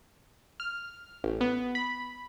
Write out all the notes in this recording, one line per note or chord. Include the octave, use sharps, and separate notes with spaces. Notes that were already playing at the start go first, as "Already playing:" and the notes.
F6
A1
B3
B5